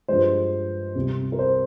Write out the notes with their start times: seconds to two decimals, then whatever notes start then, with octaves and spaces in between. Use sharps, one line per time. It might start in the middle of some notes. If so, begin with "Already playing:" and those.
0.08 G2 F3 G#3 C5
0.95 C2 C3 G3
1.32 A#4
1.39 C5